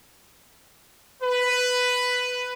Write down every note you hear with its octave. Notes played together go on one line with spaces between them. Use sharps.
B4